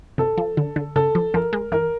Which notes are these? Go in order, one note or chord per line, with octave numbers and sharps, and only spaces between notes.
C3 A4
F3
D3
D3
C#3 A4
F3
F3 A#4
G#3
E3 A#4